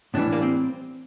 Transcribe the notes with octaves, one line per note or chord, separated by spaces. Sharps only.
A2 E3 G3 D4
A#3
C4